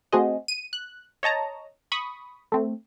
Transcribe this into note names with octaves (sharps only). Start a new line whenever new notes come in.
A3 C4 F#4 G#4 C5 D#5
D#7
F#6
C#5 D#5 A5 A#5
B5 C#6 D#6
A3 C4